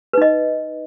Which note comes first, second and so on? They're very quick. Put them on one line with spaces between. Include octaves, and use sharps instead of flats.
B4 D#4 D#5